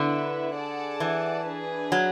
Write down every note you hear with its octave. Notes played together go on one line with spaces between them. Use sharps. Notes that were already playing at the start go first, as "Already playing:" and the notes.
Already playing: D3 B3 E4 B4 E5
G#4 D5 F#5 A5
E3
D4 G#4 B4
F#3